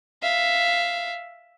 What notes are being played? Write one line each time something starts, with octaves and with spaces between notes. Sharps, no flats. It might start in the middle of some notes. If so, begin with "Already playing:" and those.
E5 F5